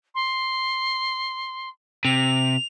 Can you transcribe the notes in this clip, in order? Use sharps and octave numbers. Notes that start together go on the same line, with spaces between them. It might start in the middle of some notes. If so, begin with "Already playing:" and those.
C6
C3 F7